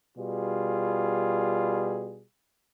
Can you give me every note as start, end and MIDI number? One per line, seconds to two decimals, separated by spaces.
0.17 2.24 47
0.17 2.24 55
0.17 2.24 65
0.17 2.24 68